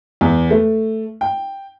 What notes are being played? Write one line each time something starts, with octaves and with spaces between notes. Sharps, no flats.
E2
A3
G5